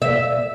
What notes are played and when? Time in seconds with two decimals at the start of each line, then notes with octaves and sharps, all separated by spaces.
0.02 E5